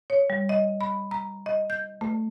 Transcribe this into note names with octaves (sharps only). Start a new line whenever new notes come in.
C#5
G3
D#5
B5
A#5
D#5
G6
A3